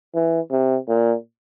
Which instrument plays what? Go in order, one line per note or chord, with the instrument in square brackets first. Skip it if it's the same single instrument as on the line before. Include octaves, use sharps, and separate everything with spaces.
[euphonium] E3
C3
A#2